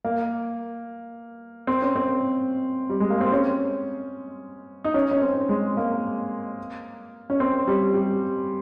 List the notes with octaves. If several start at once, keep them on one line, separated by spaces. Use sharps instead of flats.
A#3
C4
C#4
C4
G3
G#3
A#3
C4
C#4
D#4
C#4
C#4
C4
G#3
A#3
C#4
C4
G3
G3